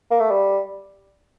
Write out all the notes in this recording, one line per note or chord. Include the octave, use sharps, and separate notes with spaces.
A#3
A3
G3